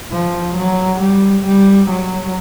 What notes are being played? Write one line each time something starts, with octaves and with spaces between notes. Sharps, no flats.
F3
F#3
G3
G3
F#3